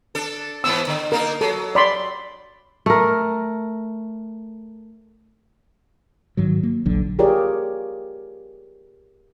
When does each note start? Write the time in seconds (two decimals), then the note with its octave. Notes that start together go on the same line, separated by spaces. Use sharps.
0.15 D4 A4
0.64 G#2 E3 B3 E6
0.87 D3
1.12 A#3 D4 D#4 A#4
1.41 F#3 A4
1.75 D5 B5 C6
2.86 A3 A#4
6.37 G#2 D#3 F#3
6.63 A#3
6.86 E1 A#1 D3 F#3
7.19 F4 G4 G#4 A#4 C#5 D5